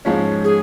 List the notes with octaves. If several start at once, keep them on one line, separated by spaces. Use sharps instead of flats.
G#2 F3 G#3 C#4
G#4